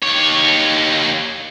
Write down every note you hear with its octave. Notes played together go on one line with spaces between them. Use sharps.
D#2 C#5